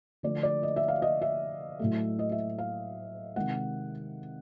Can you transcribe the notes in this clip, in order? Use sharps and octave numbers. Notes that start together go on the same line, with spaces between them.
D3 F3 A3 D5
D5
D#5
E5
F5
D#5
E5
A2 F#3 A3
D#5
E5
F5
C3 D#3 G#3 F#5